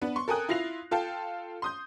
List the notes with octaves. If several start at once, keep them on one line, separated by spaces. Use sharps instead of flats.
B3 D4 B4
C6 C#6
A4 A#4 G5 G#5 D#6 F#6
E4 F4 A#6 C7 F7
F4 A4 F5 G5 A5
C6 D#6 G6